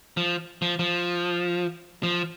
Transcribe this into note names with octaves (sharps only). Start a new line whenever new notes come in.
F3
F3
F3
F3